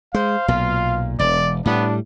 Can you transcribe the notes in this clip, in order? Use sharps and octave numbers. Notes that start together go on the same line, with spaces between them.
G#3 C5 F5
B1 A#2 F4
E1 D5
A2 G3 B3 D4